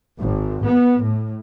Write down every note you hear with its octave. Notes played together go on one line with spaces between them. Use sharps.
G#1
B3
A2